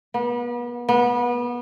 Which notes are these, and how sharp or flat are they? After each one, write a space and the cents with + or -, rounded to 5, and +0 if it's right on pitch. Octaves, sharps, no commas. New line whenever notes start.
B3 -35
B3 -25